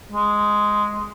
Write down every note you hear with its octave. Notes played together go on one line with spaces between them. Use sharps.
G#3